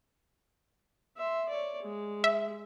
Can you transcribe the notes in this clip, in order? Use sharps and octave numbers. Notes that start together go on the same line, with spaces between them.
E5 C6
C#5 D5
G#3
E5